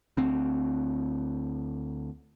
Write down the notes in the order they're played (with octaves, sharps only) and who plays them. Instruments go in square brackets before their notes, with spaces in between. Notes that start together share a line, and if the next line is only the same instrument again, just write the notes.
[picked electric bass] D2 C4